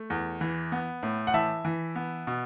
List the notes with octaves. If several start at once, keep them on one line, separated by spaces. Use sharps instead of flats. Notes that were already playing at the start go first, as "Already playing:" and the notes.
Already playing: A3
E2
E3
B3
A2
F#5
E3 E5 A5
E3
B3
B2